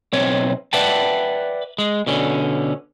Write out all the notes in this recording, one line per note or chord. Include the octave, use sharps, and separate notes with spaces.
B1 C4 C#5
B4 D5 E5 F#5 G5 A5
G#3
B2 D3 C#4